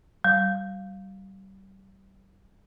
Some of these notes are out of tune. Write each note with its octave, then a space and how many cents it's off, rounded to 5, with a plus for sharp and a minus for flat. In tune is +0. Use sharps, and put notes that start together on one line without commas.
G3 -30